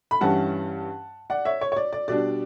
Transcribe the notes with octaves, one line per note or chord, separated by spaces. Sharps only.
B5
G2 E3 G3 C#4 F#5 A5
D5 F#5
C#5 E5
C#5
C#5
D5
D5
B2 G3 D4 D5